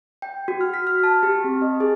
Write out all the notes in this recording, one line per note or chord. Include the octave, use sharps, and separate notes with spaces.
G5
F#4
F6
B6
F6
A5
G4
C4
D#5
G#4